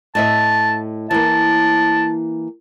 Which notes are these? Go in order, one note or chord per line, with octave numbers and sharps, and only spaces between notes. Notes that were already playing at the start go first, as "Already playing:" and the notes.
A2 D#5 E5 A5
E3 A#3 A5